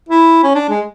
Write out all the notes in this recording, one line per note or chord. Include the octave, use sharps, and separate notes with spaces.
E4
C#4
D4
G#3